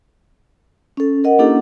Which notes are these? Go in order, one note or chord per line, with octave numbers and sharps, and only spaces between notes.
C#4 A4
A#4 D#5 F#5
A#3 C#4 D4 E4 G4 A4